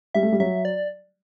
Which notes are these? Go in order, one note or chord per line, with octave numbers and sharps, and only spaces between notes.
G3 E5
A3
G3
F#3 E5
D5